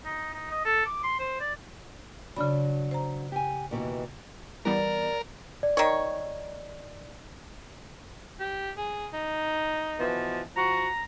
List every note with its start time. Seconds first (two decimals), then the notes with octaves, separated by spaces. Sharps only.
0.05 D#4
0.34 D#4
0.50 D#5
0.65 A4
0.86 D6
1.03 C6
1.19 C5
1.40 D5
2.36 C#3 F#3 D4 B5
2.91 C5 A#5
3.32 G4 G#5
3.71 D#2 B2 E3
4.65 E3 G3 B3 A#4 D5
5.63 D5
5.77 D#3 C#5
8.40 G4
8.77 G#4
9.13 D#4
9.98 B2 E3 F3
10.56 F3 F#4 A#5